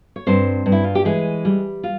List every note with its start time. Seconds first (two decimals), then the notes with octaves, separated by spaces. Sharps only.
0.16 C#5
0.27 G2 C4 C5
0.66 G2
0.72 E4
0.84 F4
0.95 G4
1.05 E3 G#3 G#4
1.45 G3
1.84 F4